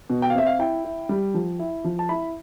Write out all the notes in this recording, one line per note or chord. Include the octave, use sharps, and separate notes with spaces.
B2
G5
F5
C4 E5
F5
E4 G5
E4
G3
F3
E4
F3
A5
E4 B5